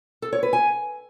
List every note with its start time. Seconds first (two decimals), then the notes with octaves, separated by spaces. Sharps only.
0.22 A4
0.33 C#5
0.43 B4
0.53 G#5